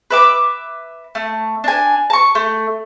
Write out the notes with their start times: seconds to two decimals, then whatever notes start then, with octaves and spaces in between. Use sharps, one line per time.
0.10 B4 E5 D6
1.15 A3
1.64 D4 G#5
2.10 A5 C#6
2.35 A3